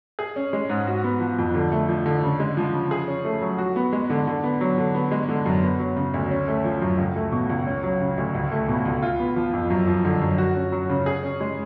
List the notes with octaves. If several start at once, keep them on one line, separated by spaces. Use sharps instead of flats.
G#4
C#4
G#3
G#2
F#4
B3
F3
F2
D3
A3
F3
D3
C#3
G#3
F3
C#3
G#4
C#4
A3
F#3
F#4
B3
G#3
D3
D3
B3
F#3
D3
B3
G#3
D3
F#2
B3
F#3
C#3
D2
C#4
A3
F3
F#2
C#2
A3
B2
C#2
C#4
F#3
C#3
D2
C#2
A3
B2
C#2
F4
B3
F3
F2
F#2
F3
D3
F#2
F#4
C#4
F#3
C#3
G#4
C#4
G#3